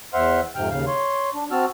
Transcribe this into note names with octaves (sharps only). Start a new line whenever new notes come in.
E2 C5 E5 F#5 C6 F6
F2 G#2 C3 G5 F6
D#2 C#3 F5
C#5 C6
D4
C4 F#4 A5 E6 F6